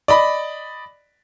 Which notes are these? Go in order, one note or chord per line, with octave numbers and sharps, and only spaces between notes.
D5 D#5 B5